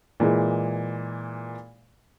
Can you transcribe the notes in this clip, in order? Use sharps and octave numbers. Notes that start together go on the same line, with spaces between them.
A#2 E3 G#3